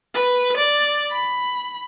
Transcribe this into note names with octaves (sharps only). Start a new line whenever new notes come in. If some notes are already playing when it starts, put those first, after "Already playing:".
B4
D5
B5